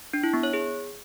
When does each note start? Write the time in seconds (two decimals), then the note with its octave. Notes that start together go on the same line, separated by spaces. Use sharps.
0.13 D4
0.23 E4
0.33 B3
0.43 C#5
0.53 G#4